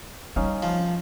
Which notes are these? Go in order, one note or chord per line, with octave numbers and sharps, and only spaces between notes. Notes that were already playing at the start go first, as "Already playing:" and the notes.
G3 C#4 D#4 F5
F3